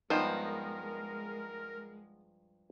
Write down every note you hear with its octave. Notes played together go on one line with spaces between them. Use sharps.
G2 F3 G#3 B3 D#4 A#4 C5